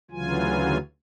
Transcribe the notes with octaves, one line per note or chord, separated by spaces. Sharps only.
D2 C#3 E3 F#3 F4 G#5